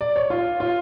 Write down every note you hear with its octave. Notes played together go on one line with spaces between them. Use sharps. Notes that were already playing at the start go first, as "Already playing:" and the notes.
D5
C#5
F4
F4